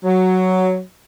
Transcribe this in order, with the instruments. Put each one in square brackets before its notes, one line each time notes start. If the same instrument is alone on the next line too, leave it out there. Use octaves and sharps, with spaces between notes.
[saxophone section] F#3